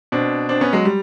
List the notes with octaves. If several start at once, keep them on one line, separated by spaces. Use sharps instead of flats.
B2 C4 D4
C4 D4
B3 C#4
F#3 G#3
G3